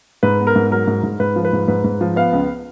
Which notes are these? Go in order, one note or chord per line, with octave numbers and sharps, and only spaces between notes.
G#2 B4
B3
A#4
G#2
F#3 A#4
G#2
G#2
G#2 B4
F3
B4
G#2
G#2 B4
G#2
F3
B3 F5
C#2